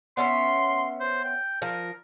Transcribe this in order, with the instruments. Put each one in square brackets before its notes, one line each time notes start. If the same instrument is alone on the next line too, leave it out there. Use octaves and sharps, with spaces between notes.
[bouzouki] B3 C#4 E5 [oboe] C6
[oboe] C5
G5
[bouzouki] F3 [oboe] A#4